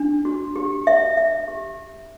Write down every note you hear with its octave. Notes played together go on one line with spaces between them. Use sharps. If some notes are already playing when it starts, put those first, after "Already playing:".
Already playing: D4
F#4
G4
E5
E5
G4